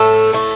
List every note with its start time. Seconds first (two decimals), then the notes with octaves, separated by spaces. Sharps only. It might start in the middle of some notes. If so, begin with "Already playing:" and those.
Already playing: A2 A3 A4
0.33 A2 A3